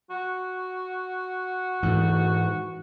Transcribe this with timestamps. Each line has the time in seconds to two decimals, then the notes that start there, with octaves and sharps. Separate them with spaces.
0.10 F#4
1.83 G#2 E3